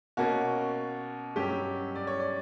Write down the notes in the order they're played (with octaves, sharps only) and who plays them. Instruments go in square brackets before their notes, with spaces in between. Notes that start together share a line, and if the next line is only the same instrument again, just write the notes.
[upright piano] B2 A#3 C#4 F#4
G2 F#3 C#4 G4
D5
C#5
D5